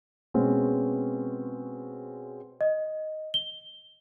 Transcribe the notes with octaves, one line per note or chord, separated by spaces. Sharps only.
B2 G#3 C4 C#4
D#5
G7